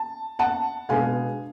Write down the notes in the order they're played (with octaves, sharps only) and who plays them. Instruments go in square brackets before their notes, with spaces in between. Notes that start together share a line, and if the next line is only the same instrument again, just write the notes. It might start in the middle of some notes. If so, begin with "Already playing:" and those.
Already playing: [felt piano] A5
F#5 A5
B2 G#3 B3 D4 F5 G#5